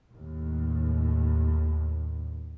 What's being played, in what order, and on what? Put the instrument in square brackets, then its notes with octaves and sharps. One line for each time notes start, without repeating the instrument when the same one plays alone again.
[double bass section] D#2 A2